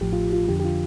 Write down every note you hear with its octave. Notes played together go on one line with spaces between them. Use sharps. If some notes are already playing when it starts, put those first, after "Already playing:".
A1 A2 F3 G4
F4
F4
F2 D3 F3 G4
G4
F4